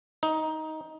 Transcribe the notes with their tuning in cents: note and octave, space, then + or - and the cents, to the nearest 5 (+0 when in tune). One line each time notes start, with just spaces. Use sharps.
D#4 +15